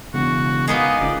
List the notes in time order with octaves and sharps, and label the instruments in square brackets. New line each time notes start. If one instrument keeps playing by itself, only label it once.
[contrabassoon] E1 [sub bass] C#3 [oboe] F#4
[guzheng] G#3 A#3 D#4 [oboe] B3
[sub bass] F#1 [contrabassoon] C#2 [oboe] D5